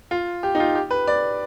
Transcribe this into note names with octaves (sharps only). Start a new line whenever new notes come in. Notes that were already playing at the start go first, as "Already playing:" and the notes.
F4
G4
D#4
F4
G4
B4
D5